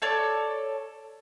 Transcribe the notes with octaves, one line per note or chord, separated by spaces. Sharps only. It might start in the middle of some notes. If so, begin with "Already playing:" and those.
A4 C#5 D5